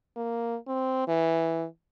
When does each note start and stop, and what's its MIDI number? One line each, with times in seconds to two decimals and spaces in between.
0.17 0.57 58
0.68 1.06 60
1.08 1.66 52